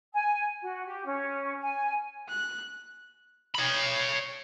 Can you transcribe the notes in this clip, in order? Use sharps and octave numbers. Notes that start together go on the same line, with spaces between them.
G#5
F#4
G4
C#4
G#5
F#6
C#5 B5